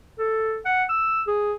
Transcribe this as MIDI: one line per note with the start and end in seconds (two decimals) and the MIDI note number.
0.19 0.59 69
0.65 0.84 78
0.89 1.22 88
1.27 1.55 68